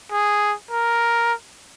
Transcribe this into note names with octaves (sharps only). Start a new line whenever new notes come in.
G#4
A#4